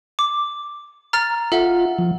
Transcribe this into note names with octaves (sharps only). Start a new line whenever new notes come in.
D6
A#5 F6 A6
F4 A4 E5 F#5
F3